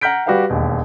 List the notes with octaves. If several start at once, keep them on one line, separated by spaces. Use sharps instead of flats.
F#5 A#5 F6 G6 B6 D7
G3 F#4 G4 B4 F5 F#5
E1 D#2